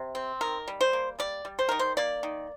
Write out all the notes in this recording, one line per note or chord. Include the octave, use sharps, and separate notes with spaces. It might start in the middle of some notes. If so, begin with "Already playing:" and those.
Already playing: C3
C4
D#3 A#4
G3
C5
A#3
G3 D5
G3
C5
D#3 A#4
C5
A#3 D5
D#3